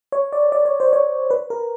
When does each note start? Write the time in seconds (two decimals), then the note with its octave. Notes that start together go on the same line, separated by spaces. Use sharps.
0.12 C#5
0.33 D5
0.52 D5
0.65 C#5
0.80 C5
0.93 C#5
1.31 B4
1.50 A#4